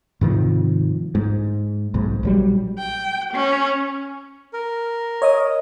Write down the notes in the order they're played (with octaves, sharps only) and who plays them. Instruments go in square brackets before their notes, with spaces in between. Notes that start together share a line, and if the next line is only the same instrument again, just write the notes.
[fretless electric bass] G#2 C3 D#3 F3
G#2
B1 G#2
A#1 F#3 G3
[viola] G5
C#4
[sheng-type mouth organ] A#4
[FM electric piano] C#5 D#5 D#6